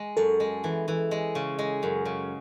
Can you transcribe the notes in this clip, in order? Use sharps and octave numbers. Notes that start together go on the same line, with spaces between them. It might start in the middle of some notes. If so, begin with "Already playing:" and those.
Already playing: G#3
F#2 A4
G#3
E3
E3
G#3
C#3
G#3
F#2
C#3